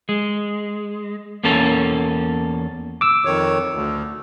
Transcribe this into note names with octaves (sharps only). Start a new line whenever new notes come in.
G#3
E2 A#3 C#4 A4
D6 E6
F2 D#3 C#5
D2